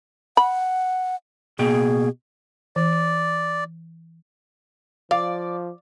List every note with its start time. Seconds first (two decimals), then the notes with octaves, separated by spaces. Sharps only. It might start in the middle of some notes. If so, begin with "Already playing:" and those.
0.37 F#5 B5
1.59 B2 A#3 G#4 G5
2.76 E3 D5
5.11 F3 D5 F5